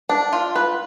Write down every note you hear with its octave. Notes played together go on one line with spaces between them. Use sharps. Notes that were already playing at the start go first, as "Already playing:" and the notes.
D4
F4
B4